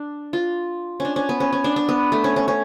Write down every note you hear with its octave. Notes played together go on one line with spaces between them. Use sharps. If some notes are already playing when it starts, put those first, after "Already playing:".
Already playing: D4
F4
C#4 D4
C#4
B3
C#4
C#4
D4
D4
B3
A3
C#4
C#4
C#4